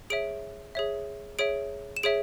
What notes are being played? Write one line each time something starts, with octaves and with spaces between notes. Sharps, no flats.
G#4 C#5 E5 D7
G#4 C#5 E5
G#4 C#5 E5 D7
E7
G#4 C#5 E5 D7